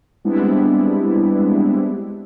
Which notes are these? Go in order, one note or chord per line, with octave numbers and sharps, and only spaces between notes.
G3 G#3 B3 C4 D4 E4